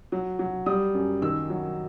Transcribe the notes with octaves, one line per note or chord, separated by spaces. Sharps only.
F#3
F#3
G3 D#6
F#2
D#3 E6
F#3